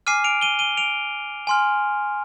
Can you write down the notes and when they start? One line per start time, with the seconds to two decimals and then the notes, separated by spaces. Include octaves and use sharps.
0.07 G#5 D6 F6 C7 D#7
0.24 D7 F7
0.41 D#7 G7
0.59 D#7 G7
0.77 D7 F7
1.47 G#5 C6 F6